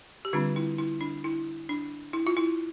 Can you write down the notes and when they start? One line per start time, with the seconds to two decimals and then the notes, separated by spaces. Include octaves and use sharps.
0.25 G4
0.33 D3 G3 C4 D4 F4
0.56 E4
0.78 E4
1.01 D4
1.24 E4
1.69 D4
2.13 E4
2.27 F4
2.37 E4